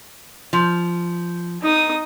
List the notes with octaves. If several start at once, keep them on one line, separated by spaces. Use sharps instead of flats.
F3
D#4 D#6